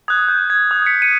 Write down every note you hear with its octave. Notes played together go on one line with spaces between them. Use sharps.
D#6 F#6 G#6
G6
G#6
D#6 F#6
B6 C#7
C#7 D#7